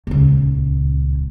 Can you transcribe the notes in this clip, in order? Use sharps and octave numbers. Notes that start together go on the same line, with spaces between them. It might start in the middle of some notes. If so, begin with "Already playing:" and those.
D#1 C#2